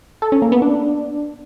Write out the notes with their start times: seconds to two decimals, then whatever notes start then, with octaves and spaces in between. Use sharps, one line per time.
0.22 A4
0.32 C#4
0.42 A#3
0.52 B3
0.62 D4